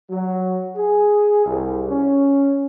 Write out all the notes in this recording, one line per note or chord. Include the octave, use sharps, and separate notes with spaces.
F#3
G#4
C2
C#4